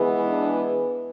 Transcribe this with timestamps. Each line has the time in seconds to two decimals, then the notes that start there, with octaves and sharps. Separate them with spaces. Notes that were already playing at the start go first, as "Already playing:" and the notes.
Already playing: E3 G#3 B3
0.28 D4